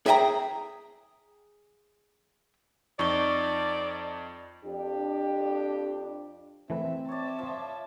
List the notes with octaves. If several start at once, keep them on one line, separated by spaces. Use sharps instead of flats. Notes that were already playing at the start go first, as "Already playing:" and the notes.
G#4 E5 G5 G#5 A#5
F2 D#4 D5 C#6 G7
F2 D4 G4
E3 A3 C4 B4 E5
C#5 D5 E5 A5
F3